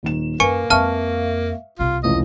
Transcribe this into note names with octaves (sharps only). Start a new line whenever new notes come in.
D#1 D#3 E7
F#2 A#3 B4 G#5 C#6 C#7
F2 G#3 B4 E5 F5 A5 C#6 F6
C2 C3 F4
F1 C#2 E3 D#5